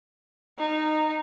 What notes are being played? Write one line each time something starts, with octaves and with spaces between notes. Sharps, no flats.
D#4